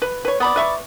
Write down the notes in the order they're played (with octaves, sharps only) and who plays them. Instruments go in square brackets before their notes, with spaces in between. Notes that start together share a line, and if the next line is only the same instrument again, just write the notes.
[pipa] B4
B4 C#5
[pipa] B3 [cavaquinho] D5 B5 D#6
[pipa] B4 E5 C#6